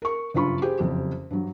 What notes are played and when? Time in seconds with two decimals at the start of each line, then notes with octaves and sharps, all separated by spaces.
0.02 A#4 C#6
0.34 F#1 G2 F4 B5 C#6
0.62 G4 G#4 C5
0.79 F#1 F2 G4
1.30 G2 F#3